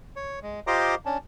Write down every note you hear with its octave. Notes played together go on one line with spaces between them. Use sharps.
C#5
G#3
F4 G4 C5 D#5 A#5 D6
C#4 D4